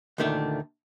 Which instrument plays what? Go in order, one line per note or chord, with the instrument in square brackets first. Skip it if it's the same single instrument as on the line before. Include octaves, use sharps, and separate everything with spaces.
[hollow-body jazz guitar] D2 A#2 D#3 A3 D4 E5